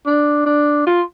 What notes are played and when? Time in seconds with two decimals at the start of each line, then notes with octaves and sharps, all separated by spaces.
0.06 D4
0.46 D4
0.86 F4